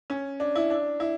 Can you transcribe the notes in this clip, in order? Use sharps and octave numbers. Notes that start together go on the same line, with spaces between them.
C#4
D4
E4
D4
E4